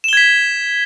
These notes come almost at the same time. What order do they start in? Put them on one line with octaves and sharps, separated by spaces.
E7 G7 G#6 B6